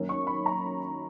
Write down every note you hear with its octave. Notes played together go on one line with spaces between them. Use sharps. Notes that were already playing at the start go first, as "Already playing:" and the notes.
Already playing: F#2 D#3 A#3 C#4
C#6
B5
A#5